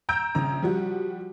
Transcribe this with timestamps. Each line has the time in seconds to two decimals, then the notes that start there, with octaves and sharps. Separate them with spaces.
0.09 A#5 E6 G6 D7
0.35 A#1 C#3 A#5
0.62 F3 G3 F#4